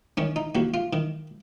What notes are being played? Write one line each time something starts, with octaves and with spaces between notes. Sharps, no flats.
D#3 C#4
D#4
D#2 F#4
F4
D#3